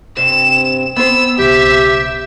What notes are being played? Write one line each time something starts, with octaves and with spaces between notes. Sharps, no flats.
G2 C3 E7
B3 C5 E6
B1 C#3 G4 E5